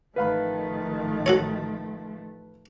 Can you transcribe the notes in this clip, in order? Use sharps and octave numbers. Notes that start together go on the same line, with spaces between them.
A1 D#3 F3 A3 B4 F5 B5
F#4 A4 C#5